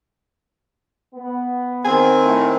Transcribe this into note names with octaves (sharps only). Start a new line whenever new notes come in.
B3
D#3 C4 G#5
A2